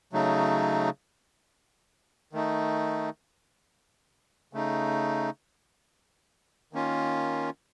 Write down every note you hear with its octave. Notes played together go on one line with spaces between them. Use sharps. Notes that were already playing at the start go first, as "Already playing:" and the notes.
C#3 F#3 A3 D#4
D#3 A3 D#4
C#3 A3 D#4
D#3 A#3 C#4 F4